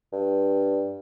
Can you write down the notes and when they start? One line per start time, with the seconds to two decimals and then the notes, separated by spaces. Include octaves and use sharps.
0.13 G2